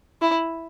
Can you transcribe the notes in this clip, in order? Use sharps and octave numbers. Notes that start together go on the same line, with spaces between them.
E4